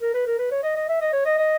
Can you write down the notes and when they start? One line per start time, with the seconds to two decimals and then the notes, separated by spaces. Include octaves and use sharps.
0.01 A#4
0.14 B4
0.26 A#4
0.38 B4
0.51 C#5
0.63 D#5
0.76 D#5
0.88 E5
1.01 D#5
1.13 C#5
1.25 D#5
1.38 D#5